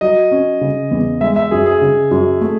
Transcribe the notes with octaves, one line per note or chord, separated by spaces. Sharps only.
F#3 D#5
C#4
C#3
E2
G#3 E5
E5
F#2 G#4
G#4
C#3
F#2
A3